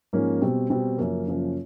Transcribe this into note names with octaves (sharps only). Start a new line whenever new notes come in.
G#2 F3 A#3 C#4
B2 G3 C4
B2 G3 C4
F#2 C#3 F3 A#3
F#2 C#3 F3 A#3